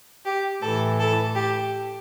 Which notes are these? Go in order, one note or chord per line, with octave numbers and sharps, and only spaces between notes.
G4
A2 E3 A4
A4
G4